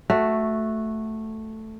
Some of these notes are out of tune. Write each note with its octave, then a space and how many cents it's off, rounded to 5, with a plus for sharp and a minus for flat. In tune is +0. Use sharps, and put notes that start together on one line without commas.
A3 +0 F#4 +0